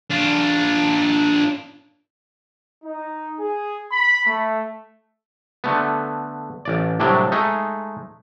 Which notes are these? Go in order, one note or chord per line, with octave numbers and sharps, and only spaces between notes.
D4 F4
D#4
G#4
B5
A3
D3 A3 B3
A1 D5
A2 C3 F#3 G3 D4
G#3 A3 D#4